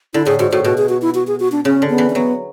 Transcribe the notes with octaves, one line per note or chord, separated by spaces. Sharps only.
D3 E4
A2 G#4
G#2 F#4
A2 F#4
B2 F#4
G#4
F#4
E4
F#4
G#4
F#4
D4
C#3 C#4
D3
B3
E3
C#4
F#3 B3